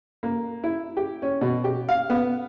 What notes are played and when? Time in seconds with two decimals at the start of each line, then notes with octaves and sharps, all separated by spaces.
0.23 A#3
0.64 E4
0.97 G4
1.22 C#4
1.41 B2
1.64 G4
1.89 F5
2.10 B3